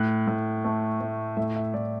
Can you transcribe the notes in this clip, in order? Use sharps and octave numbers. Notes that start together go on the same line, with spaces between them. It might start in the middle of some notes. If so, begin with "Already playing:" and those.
Already playing: A2 F#6
A2
A3
A3
A2 E5
E5
A2 D5